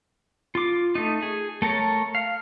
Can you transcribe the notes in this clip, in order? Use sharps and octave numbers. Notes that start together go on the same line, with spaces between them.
F4 D6
A3 D#4
G#4
A3 A4 A#4 C#5
F5